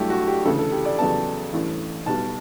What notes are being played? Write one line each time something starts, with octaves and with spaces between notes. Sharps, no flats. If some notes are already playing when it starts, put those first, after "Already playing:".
Already playing: G2 F#3 A3 E4 G4 A4
F#4
G4
D2 C#3 E3 A4
A4
G4
D5
E2 C#3 F#3 B3 A5
A1 G2 E3 A3 C#4
B1 B2 G3 B3 A5